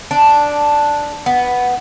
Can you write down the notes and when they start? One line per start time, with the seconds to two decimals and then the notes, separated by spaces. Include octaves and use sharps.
0.11 D4
1.26 B3